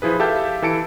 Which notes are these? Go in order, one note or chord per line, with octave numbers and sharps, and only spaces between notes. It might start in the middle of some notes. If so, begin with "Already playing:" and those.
F3 E4 G#4 B4
G4 A4 E5 F5 A5 G6
E3 A4 A5 C#7 D7